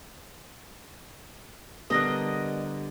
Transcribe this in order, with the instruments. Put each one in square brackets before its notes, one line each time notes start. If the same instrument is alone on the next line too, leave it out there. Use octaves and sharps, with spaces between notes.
[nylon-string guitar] D3 G3 B3 [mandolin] D4 A#4 D#5